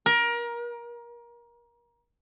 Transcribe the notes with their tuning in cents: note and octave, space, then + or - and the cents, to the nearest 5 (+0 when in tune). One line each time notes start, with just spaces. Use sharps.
A#4 +25